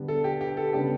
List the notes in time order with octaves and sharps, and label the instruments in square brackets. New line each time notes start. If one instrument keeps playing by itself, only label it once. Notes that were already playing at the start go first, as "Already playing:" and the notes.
Already playing: [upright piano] D3 G3 B3
[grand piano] A4
G4
G4
A4
[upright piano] C#3 G3 B3 D4 [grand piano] G4